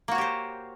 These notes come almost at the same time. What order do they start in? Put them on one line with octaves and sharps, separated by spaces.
A#3 F#4 C#5 G4 C5